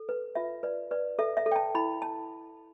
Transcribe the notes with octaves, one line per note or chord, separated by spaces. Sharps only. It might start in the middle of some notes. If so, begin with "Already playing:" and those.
Already playing: A4
B4
F4 E5
B4 D5
B4 D5
A4 E5
E5
A4
G5
A5
E4 B5
A5